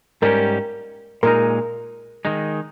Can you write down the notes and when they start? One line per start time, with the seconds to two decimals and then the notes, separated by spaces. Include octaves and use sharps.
0.22 G#2 G3 C#4 G4 A#4
1.23 A#2 G#3 D#4 A#4
2.25 D#3 G#3 D#4